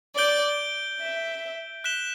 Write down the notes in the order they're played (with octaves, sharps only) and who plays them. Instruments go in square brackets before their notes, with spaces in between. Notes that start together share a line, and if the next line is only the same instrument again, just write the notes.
[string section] D5 [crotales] G6 D7 G7
[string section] E5
[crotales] F#6 B6 E7 G7